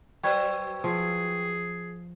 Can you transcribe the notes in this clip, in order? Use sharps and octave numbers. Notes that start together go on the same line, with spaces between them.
F#3 B4 C5 G5 C#6 G#6
F3 G#4